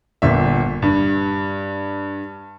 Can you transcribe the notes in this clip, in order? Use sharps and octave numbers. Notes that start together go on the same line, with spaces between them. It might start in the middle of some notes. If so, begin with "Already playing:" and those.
G1 A#2 E5
G2